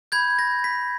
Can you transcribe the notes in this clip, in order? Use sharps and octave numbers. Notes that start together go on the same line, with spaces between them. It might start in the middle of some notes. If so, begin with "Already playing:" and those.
B5 G6 G#6
A#6
B6